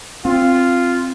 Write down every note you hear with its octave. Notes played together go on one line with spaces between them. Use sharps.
C4 F4